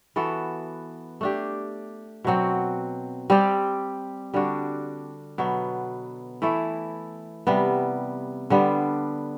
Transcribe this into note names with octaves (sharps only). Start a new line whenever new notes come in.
E3 B3 F#4 A4
A3 D4 G4
B2 F#3 C4 F#4
G3 C4 G4 D5
D3 G3 D4 F#4
B2 F#3 B3
E3 A3 E4 A4
C3 G3 B3
D3 G3 B3 D4